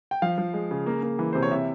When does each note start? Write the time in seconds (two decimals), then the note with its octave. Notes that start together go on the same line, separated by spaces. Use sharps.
0.11 G5
0.22 F3 F5
0.38 F3
0.54 G#3
0.71 C#3
0.86 A#3
1.03 A#3
1.19 E3
1.33 C3 C5
1.43 C#5
1.51 C3 E5